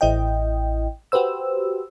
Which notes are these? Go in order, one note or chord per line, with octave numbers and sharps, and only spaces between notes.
A1 E4 D#5 G5
F#4 G4 B4 C5 E6